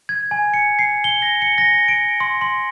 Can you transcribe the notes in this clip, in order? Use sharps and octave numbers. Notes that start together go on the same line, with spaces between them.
G#6
G#5
C#7
C7
G7
A#6
C#7
A#6
D7
C6
C6